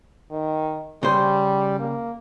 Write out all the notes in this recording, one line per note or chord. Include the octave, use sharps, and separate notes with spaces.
D#3
C#3 G3 C5
A#3